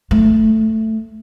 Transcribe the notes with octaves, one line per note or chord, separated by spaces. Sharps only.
A3